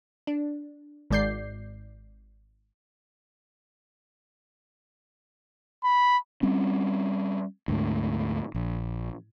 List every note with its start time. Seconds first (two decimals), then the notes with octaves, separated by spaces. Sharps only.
0.27 D4
1.10 G#1 G#2 D5 G6 C7
5.84 B5
6.43 G3 C4 C#4
7.68 D2 G#2 A3
8.55 A#1